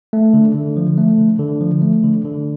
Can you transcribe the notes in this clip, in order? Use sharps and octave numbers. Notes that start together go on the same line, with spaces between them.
A3
D3
D3
F3
A3
D3
D3
F3
A3
D3
D3